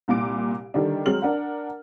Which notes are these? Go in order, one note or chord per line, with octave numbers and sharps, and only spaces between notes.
C2 A#2 D6 D7
D3 D#3 G3 D4
F#3 G#3 C4 F6 F#7
D4 A#4 F#5